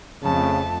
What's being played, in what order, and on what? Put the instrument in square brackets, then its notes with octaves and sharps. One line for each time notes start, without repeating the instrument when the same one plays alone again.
[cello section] F2 A3 [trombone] C#3 [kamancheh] A5